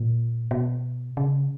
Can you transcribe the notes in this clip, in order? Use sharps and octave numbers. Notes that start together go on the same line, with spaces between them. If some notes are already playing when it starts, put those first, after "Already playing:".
Already playing: A#2
B2
C#3